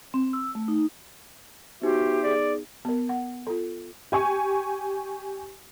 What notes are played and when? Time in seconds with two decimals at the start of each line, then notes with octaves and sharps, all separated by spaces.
0.14 C4
0.33 E6
0.55 A3
0.68 D#4
1.82 B3 D#4 F#4 G4 C5 E5
2.24 G#4 D5
2.85 B3 A#4
3.09 F#5
3.47 F4 A4
4.12 G4 G#5 C#6